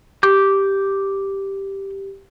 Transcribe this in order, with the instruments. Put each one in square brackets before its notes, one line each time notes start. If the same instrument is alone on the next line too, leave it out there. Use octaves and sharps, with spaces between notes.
[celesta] G4 [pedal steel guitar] D6 G6